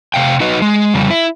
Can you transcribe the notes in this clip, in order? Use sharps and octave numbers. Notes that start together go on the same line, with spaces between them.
C3 F5 G5
D#4 F#4 B4 D#5
G#3
F2 C#3 G3
E4